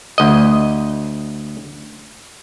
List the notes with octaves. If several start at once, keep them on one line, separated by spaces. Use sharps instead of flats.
D2 D#5